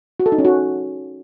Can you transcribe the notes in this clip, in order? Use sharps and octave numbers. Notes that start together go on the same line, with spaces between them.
F#4
A4
D#4
C#4
F#4